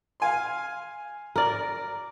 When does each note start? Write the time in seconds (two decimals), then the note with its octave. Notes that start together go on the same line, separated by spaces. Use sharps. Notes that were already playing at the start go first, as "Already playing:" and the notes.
0.20 F5 G#5 C6
1.36 A#4 D5